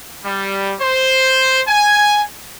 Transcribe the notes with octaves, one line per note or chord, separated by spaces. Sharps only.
G3
C5
G#5